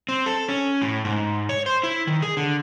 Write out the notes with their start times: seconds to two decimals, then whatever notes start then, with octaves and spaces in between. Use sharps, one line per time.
0.09 C4
0.26 A4
0.49 C#4
0.82 A2
1.05 G#2
1.49 C#5
1.66 C5
1.84 E4
2.07 D#3
2.22 G#4
2.37 D3